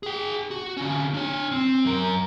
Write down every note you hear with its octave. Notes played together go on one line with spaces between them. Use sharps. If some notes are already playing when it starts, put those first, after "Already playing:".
G#4 G5
F#4
D3 C#4
D4 C#5
C4
F#2 A#4